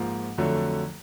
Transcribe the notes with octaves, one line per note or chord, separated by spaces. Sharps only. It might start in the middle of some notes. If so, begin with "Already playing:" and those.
Already playing: G#2 F3 A#3
F2 D3 F#3 A3